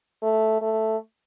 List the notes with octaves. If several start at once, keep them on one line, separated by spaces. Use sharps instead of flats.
A3
A3